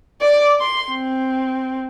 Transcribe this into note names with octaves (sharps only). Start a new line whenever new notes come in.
D5 D6
C6
C4